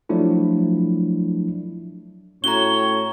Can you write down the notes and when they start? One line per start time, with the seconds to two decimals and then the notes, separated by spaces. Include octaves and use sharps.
0.09 F3 F#3 A3 D4 E4
2.44 A2 C#4 F#4 C#5 A#5 G7